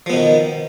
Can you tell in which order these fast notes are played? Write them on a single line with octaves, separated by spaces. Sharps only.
F3 B3 B2 D#3